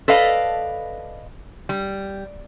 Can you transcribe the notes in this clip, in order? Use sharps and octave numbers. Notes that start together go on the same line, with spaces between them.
A4 B4 D5 D#5 F5
G3